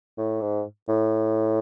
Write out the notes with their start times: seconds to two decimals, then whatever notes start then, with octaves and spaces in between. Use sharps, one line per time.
0.18 A2
0.41 G#2
0.89 A2